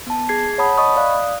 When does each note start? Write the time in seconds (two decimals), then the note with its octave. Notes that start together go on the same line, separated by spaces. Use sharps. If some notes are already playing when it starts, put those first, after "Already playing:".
0.07 B3 A5
0.29 G#4 G#6 C7
0.58 C#5 F#5 A5 B5 D#6
0.78 D#5 B5 C#6 D#6
0.97 D5 F5 D#6 F#6